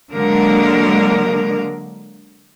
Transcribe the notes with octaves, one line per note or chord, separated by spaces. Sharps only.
D3 F#3 G#3 A#3 A#4